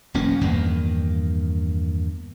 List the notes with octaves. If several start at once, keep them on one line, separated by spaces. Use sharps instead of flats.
E1 F#2 A#3 C#4
E2 G2 D#3 A#3